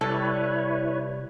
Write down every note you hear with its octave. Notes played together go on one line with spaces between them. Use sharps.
C3 G3 E4 A4 B4 C#5